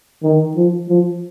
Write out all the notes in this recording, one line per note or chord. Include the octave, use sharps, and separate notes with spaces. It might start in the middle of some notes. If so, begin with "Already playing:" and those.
D#3
F3
F3